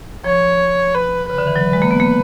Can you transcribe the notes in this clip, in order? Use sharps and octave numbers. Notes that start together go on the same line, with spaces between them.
F3 C#5
B4
C#3 B4
D3
E3
F#3
G#3
A#3
B3
A#3